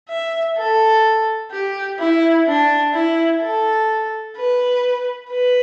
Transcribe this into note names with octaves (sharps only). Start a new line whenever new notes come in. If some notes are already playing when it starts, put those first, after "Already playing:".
E5
A4
G4
E4
D4
E4
A4
B4
B4